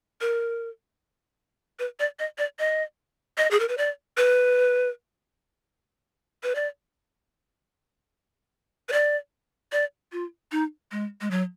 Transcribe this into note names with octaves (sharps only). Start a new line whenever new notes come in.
A#4
B4
D5
D#5
D5
D#5
D#5
G#4
A#4
B4
D5
B4
B4
D5
B4
D5
D5
F4
D#4
G#3
G#3
F#3